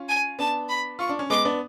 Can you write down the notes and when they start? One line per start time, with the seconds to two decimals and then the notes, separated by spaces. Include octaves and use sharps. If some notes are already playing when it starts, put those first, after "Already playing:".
Already playing: C#4 F4
0.09 G#5
0.39 B3 D4 A5
0.69 B5
0.99 F4 C#6
1.09 D4
1.19 C#4
1.30 G#3 B3 D6
1.45 B3 D4